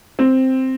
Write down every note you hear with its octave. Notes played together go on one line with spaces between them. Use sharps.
C4